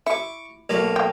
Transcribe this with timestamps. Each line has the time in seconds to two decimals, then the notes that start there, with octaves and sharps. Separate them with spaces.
0.06 E4 C#6 D6
0.69 B1 A3 A#3
0.96 G5